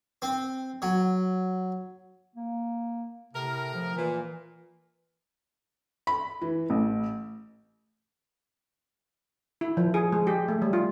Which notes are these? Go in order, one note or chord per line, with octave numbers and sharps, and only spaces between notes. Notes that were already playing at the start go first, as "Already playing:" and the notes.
C4
F#3
A#3
A2 C3 A#4
F3
A#2 E3
B5
E3
A1
E4
F3
G#4
G#3
G4
A3
G3
F4